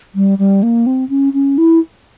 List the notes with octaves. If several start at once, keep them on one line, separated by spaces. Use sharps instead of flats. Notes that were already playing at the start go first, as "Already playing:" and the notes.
G3
G3
A#3
C4
C#4
C#4
E4